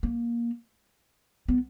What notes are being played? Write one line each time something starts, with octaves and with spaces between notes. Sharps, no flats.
A#3
B3